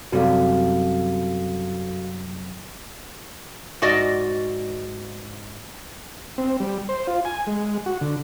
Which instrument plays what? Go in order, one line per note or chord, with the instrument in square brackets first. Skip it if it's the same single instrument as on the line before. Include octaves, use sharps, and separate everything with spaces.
[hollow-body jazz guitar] F#2 C3 G3 [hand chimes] F#4 A4 F5
[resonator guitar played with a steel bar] G#2 F#4 D5 D#5
[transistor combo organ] C4
G3
C5
F4
G#5
G#3
F#4
D3